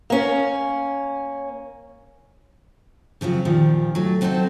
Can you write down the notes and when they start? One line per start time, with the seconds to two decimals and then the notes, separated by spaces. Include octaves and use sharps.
0.10 A#3 C#4
3.21 C#3 F3 F#3 C4
3.45 A#2 D#3 F3 G3
3.95 F#3 A3
4.21 F#3 C4 D#4 E4 A4 C5